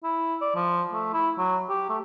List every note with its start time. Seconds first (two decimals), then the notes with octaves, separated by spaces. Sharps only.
0.04 E4
0.41 D5
0.55 F3
0.93 A3
1.14 E4
1.38 F#3
1.69 G4
1.89 A3